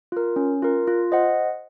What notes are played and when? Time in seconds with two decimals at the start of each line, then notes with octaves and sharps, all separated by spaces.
0.12 F4 A#4
0.36 C#4
0.62 F4 A#4
0.87 F4
1.12 C5 D#5 F#5